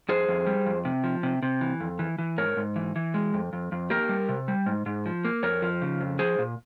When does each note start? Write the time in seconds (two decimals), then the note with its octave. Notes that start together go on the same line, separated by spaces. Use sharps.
0.09 F2 G#4 C5
0.28 F2
0.47 G3
0.66 F2
0.85 C3
1.04 F3
1.23 C3
1.42 C3
1.61 E3
1.80 F2
1.99 E3
2.19 E3
2.38 G#2 A#4 C#5
2.57 G#2
2.76 E3
2.96 E3
3.14 G#3
3.34 F2
3.53 F2
3.72 F2
3.90 A#3 G4 A#4
4.09 G3
4.29 C3
4.48 G3
4.66 G#2
4.86 G#2
5.06 F3
5.25 A#3
5.43 F2 A#4 C#5
5.62 F3
5.82 C#3
6.00 F2
6.19 F3 G#4 C5
6.38 A#2